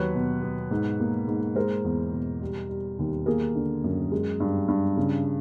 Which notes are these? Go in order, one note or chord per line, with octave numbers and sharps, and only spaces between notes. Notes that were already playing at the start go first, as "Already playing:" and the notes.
Already playing: D#2 F#3 B4 C#5
B2
B3
G#2
A#3
G#2
G#3 A#4 C5
E2
B2
G3
G3
D#2
A#3 G#4 A#4
D3
F#2
G#3
G2
G2
C#3